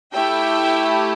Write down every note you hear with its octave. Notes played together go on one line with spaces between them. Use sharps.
A3 E4 G4 E5 G5